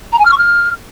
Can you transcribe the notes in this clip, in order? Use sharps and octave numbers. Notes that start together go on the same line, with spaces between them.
A#5
G#5
F6
C#6
F6